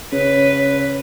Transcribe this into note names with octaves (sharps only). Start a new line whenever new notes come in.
C#3 B4 C#5